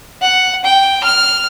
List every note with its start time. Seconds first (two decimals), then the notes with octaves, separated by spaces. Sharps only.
0.21 F#5
0.64 G5
1.03 F6